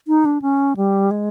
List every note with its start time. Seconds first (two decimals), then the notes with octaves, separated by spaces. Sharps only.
0.08 D#4
0.25 D4
0.42 C#4
0.77 G3
1.11 G#3